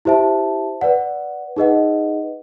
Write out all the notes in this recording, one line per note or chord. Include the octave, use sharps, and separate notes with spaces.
E4 G4 C5 E5 A5
B4 D5 F#5
D#4 G#4 B4 D#5 F#5